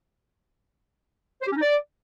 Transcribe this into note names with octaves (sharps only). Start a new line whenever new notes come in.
C5
G4
C#4
D#4
D5